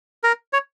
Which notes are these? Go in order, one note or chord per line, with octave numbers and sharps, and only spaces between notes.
A#4
C#5